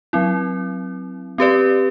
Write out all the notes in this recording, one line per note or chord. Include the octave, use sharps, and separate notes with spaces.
F#3 C4 E4
C4 G4 B4 D5